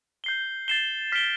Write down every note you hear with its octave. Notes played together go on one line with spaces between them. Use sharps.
G6 C7 G7
A6 C7 E7 G7
F6 B6 D7 G7